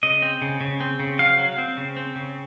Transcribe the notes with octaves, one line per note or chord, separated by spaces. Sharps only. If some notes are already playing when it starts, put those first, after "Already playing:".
C#3 D#5
C4
C#3
C#3
C4
C#3
F#3 F5
F#3
C4
C#3
C4
C#3